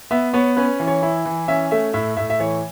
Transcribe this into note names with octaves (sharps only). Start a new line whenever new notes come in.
B3 E5
B3 C#5
C#4 B4
E3
C#5
E4
E3
C#4 E5
A3 E5
A2 E5
A2 E5
E5
E3 C#5